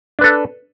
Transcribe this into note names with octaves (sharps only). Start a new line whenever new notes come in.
D4 A4 B4